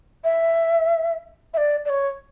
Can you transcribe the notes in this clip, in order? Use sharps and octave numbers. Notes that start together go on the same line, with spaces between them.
E5
E5
D5
D5
C#5